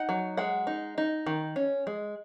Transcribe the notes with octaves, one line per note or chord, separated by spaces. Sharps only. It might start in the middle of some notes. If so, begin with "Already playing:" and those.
Already playing: D#4 F#5
F#3
G#3 F#5
D#4
D#4
D#3
C#4
G#3